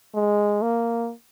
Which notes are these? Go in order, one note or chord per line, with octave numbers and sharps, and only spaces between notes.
G#3
A#3